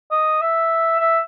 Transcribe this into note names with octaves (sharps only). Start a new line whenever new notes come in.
D#5
E5
E5